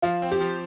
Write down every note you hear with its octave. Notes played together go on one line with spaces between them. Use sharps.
F3 F4
C4
G4
F3